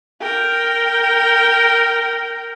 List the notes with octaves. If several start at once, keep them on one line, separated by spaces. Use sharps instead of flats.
A#4 G5